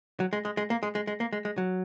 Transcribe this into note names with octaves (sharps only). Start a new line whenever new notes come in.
F#3
G#3
G#3
G#3
A#3
G#3
G#3
G#3
A#3
G#3
G#3
F#3